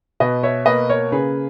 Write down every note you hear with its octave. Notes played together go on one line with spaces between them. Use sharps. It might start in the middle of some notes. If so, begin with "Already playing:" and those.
B2 B4 D#5
C#5 E5
A#3 B4 D#5
A#4 C#5
C#3 G#4 B4